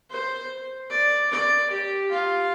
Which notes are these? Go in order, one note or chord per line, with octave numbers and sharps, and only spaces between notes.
C5
D5
D5
G4
F4